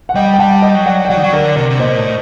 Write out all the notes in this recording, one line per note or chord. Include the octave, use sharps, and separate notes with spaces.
F#5
G3 D#5 G5
G5
G3 F#5 A5
D#5 G5
F#3
D5 F#5
G5
F#3 D5 F#5
D#3
F#3
D3 A#4 D5
C3 A#4 D5
C3
A#2 C5 D#5
A2